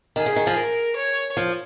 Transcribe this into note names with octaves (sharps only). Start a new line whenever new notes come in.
D#3 G#4
C#3
D#3
F3
A#4
C#5
F3